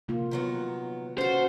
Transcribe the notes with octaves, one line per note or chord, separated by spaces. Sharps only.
C3 A#3 F4
D#3 F#3 B3
C#4 F4 F#4 A4 C5